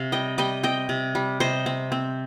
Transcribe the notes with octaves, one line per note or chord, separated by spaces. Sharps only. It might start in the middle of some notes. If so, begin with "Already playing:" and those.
Already playing: C3 C4 F5
G3 D#5 G5
G3 D#5 G5
C4 D#5 G5
C3
G3
C3 C5 D#5
C4
C4